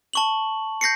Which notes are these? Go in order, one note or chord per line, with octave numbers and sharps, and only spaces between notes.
A5 C#6 F#7
G6 A#6 C7 C#7